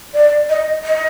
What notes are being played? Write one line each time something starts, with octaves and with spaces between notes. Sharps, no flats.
D5
D#5
D#5